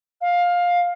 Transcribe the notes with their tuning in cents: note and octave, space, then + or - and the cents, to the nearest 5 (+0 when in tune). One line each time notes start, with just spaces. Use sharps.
F5 +15